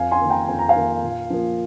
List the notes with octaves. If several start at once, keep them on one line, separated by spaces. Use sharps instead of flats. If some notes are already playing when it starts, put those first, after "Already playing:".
Already playing: F2 F5 G#5
G#5 C6
D#3 A#3
G5 A#5
F2 G#5
A#5
F5 G#5
D#3 A#3
A#2
F3 A#3